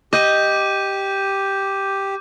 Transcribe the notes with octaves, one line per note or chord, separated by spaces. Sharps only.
G4 D#5 D6 G6 D#7